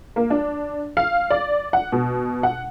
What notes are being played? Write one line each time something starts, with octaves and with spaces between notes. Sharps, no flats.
A#3
D4
F5
D5
F#5
B2
F#5